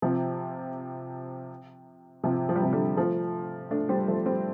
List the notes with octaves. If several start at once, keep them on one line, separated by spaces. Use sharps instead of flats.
C3 F3
C3 F3
F3
G3
C3 F3
D3 G3
F3 A3
A3 D4
G3 C4
F3 A3
G3 C4